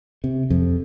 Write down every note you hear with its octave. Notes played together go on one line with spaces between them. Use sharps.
C3
F2